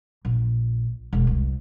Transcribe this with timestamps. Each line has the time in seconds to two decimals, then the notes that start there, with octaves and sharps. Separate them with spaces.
0.25 A#1
1.13 E1
1.27 C2